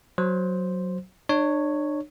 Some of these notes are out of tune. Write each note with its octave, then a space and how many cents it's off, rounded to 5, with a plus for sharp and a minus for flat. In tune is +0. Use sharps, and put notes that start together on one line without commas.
F#3 +0 C5 +0
D4 +40 C#5 +0